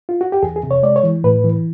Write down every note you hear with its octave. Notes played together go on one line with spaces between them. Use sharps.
F4
F#4
G4
E2 G#4
G#4
C3
C#5
G#3 D5
C#5
E3
A2 B4
E3